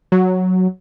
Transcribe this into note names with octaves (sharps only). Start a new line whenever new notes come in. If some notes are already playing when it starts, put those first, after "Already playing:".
F#3